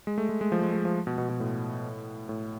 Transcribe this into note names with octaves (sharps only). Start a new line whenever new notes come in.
G#3
A3
G#3
G#3
F3
G#3
G#3
F3
B2
B2
B2
A2
A2